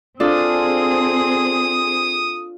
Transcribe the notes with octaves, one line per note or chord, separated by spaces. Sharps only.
C4 D4 F4 G#4 A4 D#6